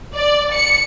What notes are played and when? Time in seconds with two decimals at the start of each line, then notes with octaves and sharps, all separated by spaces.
0.14 D5
0.52 C#7